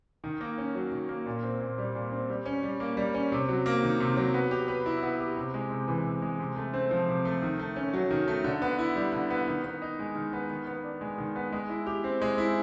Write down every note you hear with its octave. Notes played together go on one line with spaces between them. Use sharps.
D#3
A#3
C#4
F#3
D#3
A#3
A#2
C4
A#2
G3
A#2
C4
G3
C#4
G3
A#3
G3
C#4
C3
F#3
A#3
D#3
C3
F#3
B3
G4
B4
E4
B3
G4
C3
G#3
C3
E3
C3
G#3
C3
A3
C4
F3
C3
A3
D#3
A3
C#4
F#3
D#3
A3
D3
B3
E4
G3
D3
B3
D#3
B3
D#4
G#3
D#3
B3
D#3
B3
D4
G#3
D#3
B3
G#3
E4
G4
C4
G#3
E4